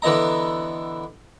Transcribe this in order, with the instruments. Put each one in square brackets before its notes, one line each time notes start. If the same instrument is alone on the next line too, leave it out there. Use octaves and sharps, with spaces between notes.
[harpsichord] D3 E3 B3 D#5 A#5